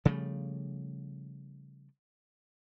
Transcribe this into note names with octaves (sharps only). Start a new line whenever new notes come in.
C#3 F3 G3 A3